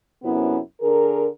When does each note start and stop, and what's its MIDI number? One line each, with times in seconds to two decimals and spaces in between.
0.24 0.59 42
0.24 0.59 48
0.24 0.59 59
0.24 0.59 61
0.24 0.59 64
0.81 1.26 50
0.81 1.26 68
0.81 1.26 70